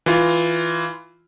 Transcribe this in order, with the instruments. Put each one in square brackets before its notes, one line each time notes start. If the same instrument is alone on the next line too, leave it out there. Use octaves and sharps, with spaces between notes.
[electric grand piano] E3 F4